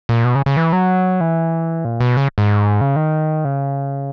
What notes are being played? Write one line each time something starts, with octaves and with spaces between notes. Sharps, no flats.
A#2
B2
C#3
C#3
E3
F#3
E3
A#2
B2
C#3
G#2
C#3
D#3
C#3